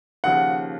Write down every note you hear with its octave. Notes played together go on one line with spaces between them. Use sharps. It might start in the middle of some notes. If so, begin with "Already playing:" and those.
D#2 C#3 F3 F#5